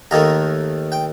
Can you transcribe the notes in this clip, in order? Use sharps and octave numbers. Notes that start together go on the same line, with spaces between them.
D#2 D#3 A3 A#5
G5